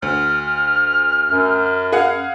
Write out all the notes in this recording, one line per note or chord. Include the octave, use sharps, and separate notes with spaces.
D2 F6
F#2
G#4 F5 F#5